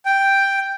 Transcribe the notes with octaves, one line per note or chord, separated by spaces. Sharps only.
G5